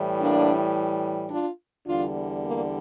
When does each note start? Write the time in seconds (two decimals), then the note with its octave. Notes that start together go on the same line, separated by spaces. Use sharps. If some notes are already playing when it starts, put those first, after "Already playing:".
Already playing: A2 E3 G3
0.19 A#3 D4
1.30 D4 F4
1.86 E2 D3 G3 D4 F4
2.43 A#3